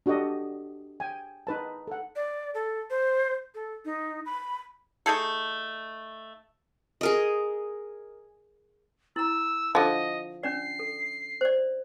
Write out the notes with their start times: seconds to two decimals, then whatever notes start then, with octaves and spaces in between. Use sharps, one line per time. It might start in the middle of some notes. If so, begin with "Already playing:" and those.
0.06 D4 F#4 G4 A4 D#5
1.00 G5 G#5
1.47 D#4 B4 A5
1.87 A4 F#5
2.16 D5
2.54 A4
2.90 C5
3.55 A4
3.85 D#4
4.26 B5
5.06 A3 D#4 G#4 A4
7.01 G#4 A#4 D#5
9.16 E4 A#5 E6
9.75 D3 F3 D#5
10.43 C#4 D4 D5 C7
10.79 A4
11.41 C5 D5